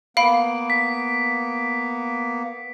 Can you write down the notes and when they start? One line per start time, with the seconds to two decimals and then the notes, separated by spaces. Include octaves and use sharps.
0.17 A#3 B3 F5 B5 D7
0.70 B6